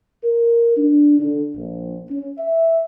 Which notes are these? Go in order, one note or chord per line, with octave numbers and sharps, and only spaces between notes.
A#4
D4
D3
A#1
C#4
E5